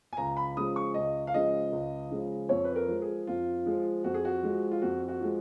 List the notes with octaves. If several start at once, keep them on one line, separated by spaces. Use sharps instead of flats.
G#5
C#2 A#5
B5
C#3 F3 G#3 D#6
C#6
C#2 D#5
F5
C#3 F3 G#3 D#5
C#2
C#3 F3 G#3
F2 C#5
B4
A#4
F3 G#3
G#4
F2 F4
F3 G#3
F2 F#4
G#4
F#4
F3 G#3
F4
F2 F#4
F#4
F3 G#3